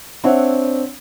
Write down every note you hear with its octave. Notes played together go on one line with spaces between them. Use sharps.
C4 D4 C#5 E5 F#5